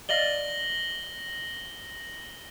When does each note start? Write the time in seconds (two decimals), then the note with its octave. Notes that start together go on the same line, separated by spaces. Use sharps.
0.09 D5 D#5 F5 A#6 F#7 G7